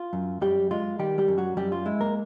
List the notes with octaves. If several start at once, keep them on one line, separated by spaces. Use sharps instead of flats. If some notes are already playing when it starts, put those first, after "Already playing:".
Already playing: F4
F#2
F#2 G3 G4
G#3 F4
D#3 G3 G4
G3 G4
F#2
F#3 F#4
F#2 G3 G4
F4
G#3 E4
A#3 A#4